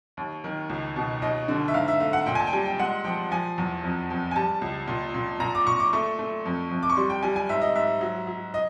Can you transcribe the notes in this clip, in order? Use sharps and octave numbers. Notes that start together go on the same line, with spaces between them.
D#2
D#3
C#2
B2
D#2 D#5
D3
E5
G#2 F5
E5
A3 F5
F#5
A#2 G5
G#5
A5
G5
G3 G#5
G5
G#3 F#5
F3 G5
F3 G#5
E2
F2
F2
G#5
G3 A5
C#2
A#2
A#2
A#2 A#5
D6
A#2 C#6
D6
A3 C#6
A3
F2
F2
D6
C#6
G3 C6
G5
G3 G#5
G#5
G#2 E5
D#5
G#2 E5
F#3
F#3
D#5